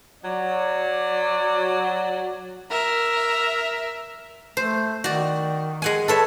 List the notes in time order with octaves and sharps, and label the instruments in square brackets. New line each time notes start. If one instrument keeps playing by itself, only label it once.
[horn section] F#3 D5
[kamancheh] A#4 E5
[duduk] A3 [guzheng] C5
[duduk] D#3 [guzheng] F#4 D5
[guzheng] G#3 F#5 G#5
[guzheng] A4 C#5 E5 [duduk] B4